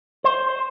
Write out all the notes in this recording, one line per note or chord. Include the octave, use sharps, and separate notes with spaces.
C5